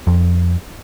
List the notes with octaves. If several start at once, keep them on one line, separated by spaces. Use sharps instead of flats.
F2